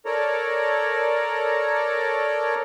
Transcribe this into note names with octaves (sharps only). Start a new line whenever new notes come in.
A4 A#4 C#5 D5 A#5